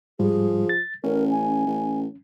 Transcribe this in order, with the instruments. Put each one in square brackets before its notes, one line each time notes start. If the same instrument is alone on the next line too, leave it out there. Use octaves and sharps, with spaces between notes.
[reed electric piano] G#2 G3 [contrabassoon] F3 [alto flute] G#4
[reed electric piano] A6
[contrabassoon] A1 [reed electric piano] C#4 [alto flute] A#4
[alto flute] G#5
[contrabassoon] A1